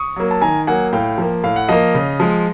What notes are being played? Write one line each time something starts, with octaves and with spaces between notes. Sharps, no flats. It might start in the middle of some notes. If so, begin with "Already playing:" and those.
Already playing: C#6 D#6
F#3 A#3
A5
D#3 G#5 A#5
F#3 A#3 F#5 G#5
A2 F5 G5
F3 A#3
A2 F5
F#5
F3 A#3 D#5 F5
C#3
F3 G#3